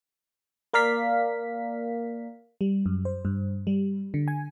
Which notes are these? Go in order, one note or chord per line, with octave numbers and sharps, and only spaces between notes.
A#3 A#4 D5 F5 B6
G3
F#2
C5
G2
G3
D3
G#5